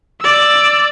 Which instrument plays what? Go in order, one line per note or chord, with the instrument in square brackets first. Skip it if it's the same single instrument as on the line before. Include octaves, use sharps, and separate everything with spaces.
[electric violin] D5 E6